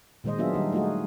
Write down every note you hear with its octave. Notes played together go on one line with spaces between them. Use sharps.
A#2 D#3 G#3 C5 D#5
F#3 B3 D4 F4 G#4 E5
D#3 G3 D#4
A3 D#4 F4 F#4 G#4